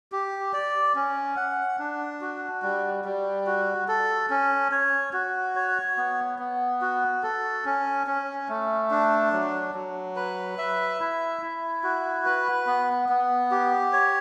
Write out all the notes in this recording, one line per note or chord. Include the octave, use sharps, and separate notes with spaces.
G4
D5
C#4
F#5
D4
F#4
G3
G3
F#4
A4
C#4
C#5
F#4
C#5
B3
B3
F#4
A4
C#4
C#4
A3
D4
F#3
F#3
B4
E5
E4
E4
F#4
B4
B3
B3
G4
C#5